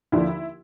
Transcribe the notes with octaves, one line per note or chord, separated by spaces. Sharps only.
D#2 D3 F3 E4